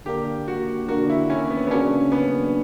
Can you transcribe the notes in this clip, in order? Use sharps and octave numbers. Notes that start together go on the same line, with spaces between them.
D3 A#3 D4 G4 A#4
F#4
D3 A#3 D4 F#4 A#4
E4
C#4
B3
B3
C#3 F#3 A#3 C#4 D4
B3